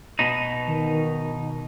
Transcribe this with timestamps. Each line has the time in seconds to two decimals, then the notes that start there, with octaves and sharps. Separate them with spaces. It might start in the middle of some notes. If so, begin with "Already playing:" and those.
0.19 B2 D#4
0.67 D#3